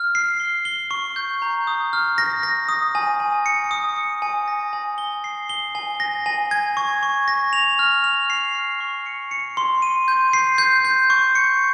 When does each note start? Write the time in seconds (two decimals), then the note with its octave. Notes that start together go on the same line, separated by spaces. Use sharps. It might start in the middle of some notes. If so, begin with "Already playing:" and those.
Already playing: F6
0.15 C7
0.40 G7
0.65 G7
0.91 C#6
1.16 G6
1.42 A#5
1.67 D#6
1.93 F6
2.18 A#6
2.43 A#6
2.69 D#6
2.95 G#5
3.20 G#5
3.46 C#7
3.71 D#6
3.96 C#7
4.22 G#5
4.48 A#6
4.73 G#5
4.98 G7
5.24 C7
5.49 G7
5.75 G#5
6.00 A#6
6.26 G#5
6.51 G#6
6.77 C#6
7.03 C#6
7.28 A#6
7.53 F7
7.79 F6
8.04 F7
8.30 C7
8.55 F6
8.80 C#6
9.06 C#7
9.31 C#7
9.57 C6
9.82 D#7
10.08 G6
10.33 C7
10.58 G6
10.85 G6
11.10 C#6
11.35 C#7